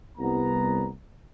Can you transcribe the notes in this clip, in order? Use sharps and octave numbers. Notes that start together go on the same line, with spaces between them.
C2 B3 A#5